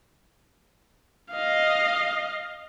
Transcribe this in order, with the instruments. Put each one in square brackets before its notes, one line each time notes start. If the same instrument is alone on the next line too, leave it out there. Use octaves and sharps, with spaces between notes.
[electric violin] D#5 F5